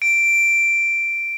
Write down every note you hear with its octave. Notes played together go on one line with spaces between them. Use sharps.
D7